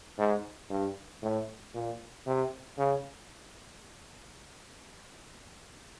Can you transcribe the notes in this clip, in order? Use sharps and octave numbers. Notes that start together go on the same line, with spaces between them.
G#2
G2
A2
A#2
C3
C#3